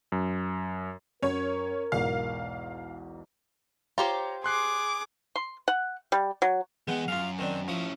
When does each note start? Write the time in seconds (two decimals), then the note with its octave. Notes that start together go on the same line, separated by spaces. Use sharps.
0.12 F#2
1.22 F#2 C#4 A#4 C#5
1.92 B1 E2 G#2 F5
3.98 F4 G4 C5 C#5 A#5
4.44 G#4 C6 D6 F#6 C7
5.36 C6
5.68 F#5
6.12 G3
6.42 F#3
6.88 E3 G#3 B3 F#5 G5
7.08 F#2 F4 F5
7.39 D#3 C4 D4
7.68 F3 C#4 E4 D#6